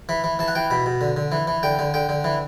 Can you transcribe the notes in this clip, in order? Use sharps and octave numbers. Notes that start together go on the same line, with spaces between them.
E3 B5
E3
E3 A5
F#5
E3 G5
B2 B5
B2
D3
D3
E3
E3
D3 G5
D3
D3 G5
D3
E3